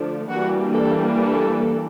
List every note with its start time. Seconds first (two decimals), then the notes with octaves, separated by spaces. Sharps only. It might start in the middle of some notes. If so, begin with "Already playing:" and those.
Already playing: D3 F3 A3 D4
0.29 E3 G3 A#3 D4 F#4
0.73 A4
1.16 A4